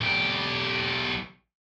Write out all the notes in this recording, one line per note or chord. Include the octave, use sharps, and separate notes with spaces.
B1 G4